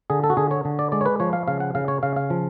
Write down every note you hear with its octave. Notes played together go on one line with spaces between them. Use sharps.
D3 G#4
A4
F#4
D3 G#4
C#5
D3
D5
G#3 D5
C#5
B4
F3 C#5
F5
C#3 F5
F#5
C#3 F5
C#5
C#3 F5
F5
F3